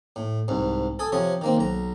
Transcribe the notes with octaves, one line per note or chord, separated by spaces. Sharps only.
A2
C2 G#2
A4 G#5 D#6
C3 F3 C#5 D#6
D#3 A#3 C4
B1 A#5